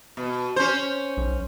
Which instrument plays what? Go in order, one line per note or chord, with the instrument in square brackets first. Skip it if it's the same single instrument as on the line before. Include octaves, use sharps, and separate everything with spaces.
[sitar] B2
C#4 C5
[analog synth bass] B1